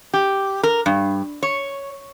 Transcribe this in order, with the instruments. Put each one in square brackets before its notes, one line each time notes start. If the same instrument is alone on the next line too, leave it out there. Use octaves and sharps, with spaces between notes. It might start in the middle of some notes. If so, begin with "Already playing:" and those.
[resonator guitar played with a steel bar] G4
A#4
G2
C#5